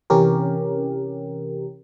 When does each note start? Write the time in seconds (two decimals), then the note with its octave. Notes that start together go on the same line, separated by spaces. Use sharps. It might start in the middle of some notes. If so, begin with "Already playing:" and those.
0.10 C3 E3 C#4 G4 A#4